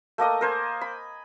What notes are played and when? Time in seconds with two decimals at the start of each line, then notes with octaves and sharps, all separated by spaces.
0.18 A3 A#3 D#5 D#6
0.41 A#4 C5 G#5
0.81 B5